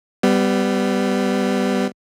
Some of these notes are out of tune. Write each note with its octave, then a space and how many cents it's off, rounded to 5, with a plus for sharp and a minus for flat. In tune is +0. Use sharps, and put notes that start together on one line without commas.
G3 +0 B3 +20